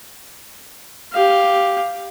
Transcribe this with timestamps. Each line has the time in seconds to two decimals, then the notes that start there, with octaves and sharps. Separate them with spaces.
1.13 G4 F5